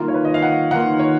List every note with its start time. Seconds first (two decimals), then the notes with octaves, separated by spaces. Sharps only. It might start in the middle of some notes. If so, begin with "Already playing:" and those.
Already playing: D#3 A#3 F4
0.08 C#5
0.14 B4
0.25 D#5
0.34 F5
0.42 F#5
0.71 D#3 A#3 F4 F#5
0.99 C#5